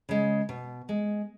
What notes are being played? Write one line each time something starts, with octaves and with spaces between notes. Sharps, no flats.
C#3 G#3
B2
G#3